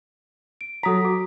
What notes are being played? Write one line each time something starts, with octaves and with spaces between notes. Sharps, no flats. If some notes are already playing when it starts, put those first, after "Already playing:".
D7
F#3 A4 A#5 D#6 B6
F#4 D6